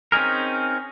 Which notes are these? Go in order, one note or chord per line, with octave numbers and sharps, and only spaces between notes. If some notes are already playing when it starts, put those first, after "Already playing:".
C4 C#4 D#4 G#4 A#4